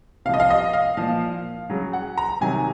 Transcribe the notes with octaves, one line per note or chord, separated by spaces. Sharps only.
C3 F3 D#5 F5
F5
D#5
F5
A#2 F3 F5
C#3 F#3
F#5
A#5
C3 D#3 F#3 G#5